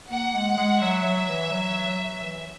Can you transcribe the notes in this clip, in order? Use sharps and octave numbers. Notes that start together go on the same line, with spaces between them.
A#3 F#5
G#3
G#3
F#3 E5
F#3
E3
F#3
F#3
E3